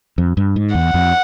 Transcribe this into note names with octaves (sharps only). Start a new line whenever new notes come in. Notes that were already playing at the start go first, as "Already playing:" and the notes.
F2
G2
G#2
E2 F#5
F2